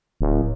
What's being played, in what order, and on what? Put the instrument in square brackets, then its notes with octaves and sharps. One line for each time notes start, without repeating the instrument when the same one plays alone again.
[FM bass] D1